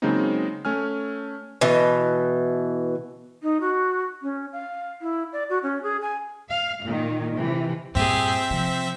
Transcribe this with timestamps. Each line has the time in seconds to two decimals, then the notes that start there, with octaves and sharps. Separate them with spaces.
0.02 C#3 F#3 G#3 A#3 C4 D#4
0.65 A3 C#4 G#5 F6
1.61 B2 E3
3.43 D#4
3.61 F#4
4.22 C#4
4.53 F5
5.02 E4
5.32 D5
5.50 F#4
5.63 C#4
5.83 G#4
6.02 G#5
6.50 F5
6.84 A#2 D#3
7.34 C3 E3
7.95 G2 A#2 C4 G4 G#4 E5
8.50 C3 F3